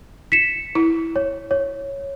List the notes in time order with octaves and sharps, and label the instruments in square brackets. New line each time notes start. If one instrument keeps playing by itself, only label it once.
[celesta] B6 C#7 E7
[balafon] E4
[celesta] C#5
C#5